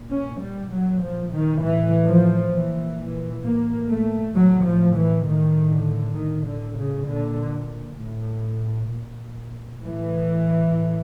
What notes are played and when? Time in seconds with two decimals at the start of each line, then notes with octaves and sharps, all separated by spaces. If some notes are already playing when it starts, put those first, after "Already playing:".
Already playing: A#2
0.10 C#4
0.40 G3
0.70 A#2 F#3
1.01 F3
1.31 D#3
1.61 A2 E3
2.08 F3
2.53 A#2 E3
2.99 E3
3.43 A2 A#3
3.89 A3
4.34 A2 F#3
4.64 F3
4.96 E3
5.25 A2 D#3
5.71 D3
6.16 A2 D#3
6.46 D3
6.77 C#3
7.07 A#2 D3
7.99 A2
8.89 A#2
9.80 A2 E3
10.72 A2